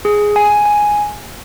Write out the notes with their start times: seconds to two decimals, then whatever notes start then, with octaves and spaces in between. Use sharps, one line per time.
0.05 G#4
0.36 G#5
0.66 G#5